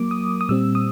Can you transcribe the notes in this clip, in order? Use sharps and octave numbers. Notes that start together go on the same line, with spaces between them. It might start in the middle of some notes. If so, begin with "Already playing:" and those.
Already playing: F#3 A#3 D6
D#6
D#6
A#2 G3 C4 E6
D#6